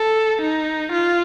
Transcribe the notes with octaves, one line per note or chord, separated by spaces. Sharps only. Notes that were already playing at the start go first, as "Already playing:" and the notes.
Already playing: A4
D#4
F4